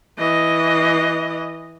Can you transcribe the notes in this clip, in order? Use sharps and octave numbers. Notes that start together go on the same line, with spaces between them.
E3 D#5